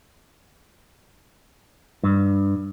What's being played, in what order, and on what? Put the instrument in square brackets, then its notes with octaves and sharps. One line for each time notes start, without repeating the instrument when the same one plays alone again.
[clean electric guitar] G2